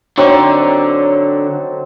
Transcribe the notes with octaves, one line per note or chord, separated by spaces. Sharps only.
D3 F#3 C4 D#4